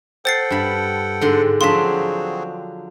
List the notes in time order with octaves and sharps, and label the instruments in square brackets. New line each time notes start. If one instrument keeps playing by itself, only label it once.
[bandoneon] A4 F#5 G5 [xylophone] C5 A6 C7
[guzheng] G2 B5
G#2 D3 C6
[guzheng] F3 F#3 D4 [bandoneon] C4 F#4 G#4 [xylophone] C6 B6